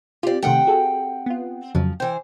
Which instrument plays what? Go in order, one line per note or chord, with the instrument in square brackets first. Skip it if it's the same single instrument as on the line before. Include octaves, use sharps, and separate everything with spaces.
[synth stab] C4 F4 [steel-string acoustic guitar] G4 D5
[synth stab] C3 D#3 A3 [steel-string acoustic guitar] C4 F#5 G5
[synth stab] F#4 G#4 A4
B3 F4
[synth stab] F2 C#3 F#3 [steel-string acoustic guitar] F3
[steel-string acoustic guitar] E3 C5 [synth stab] G5